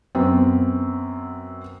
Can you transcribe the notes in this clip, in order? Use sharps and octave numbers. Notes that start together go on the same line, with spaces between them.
F#2 B3 C4